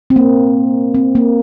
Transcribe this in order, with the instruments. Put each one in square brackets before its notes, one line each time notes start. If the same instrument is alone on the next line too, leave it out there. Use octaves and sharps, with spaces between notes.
[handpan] C4
A#3
C4
A#3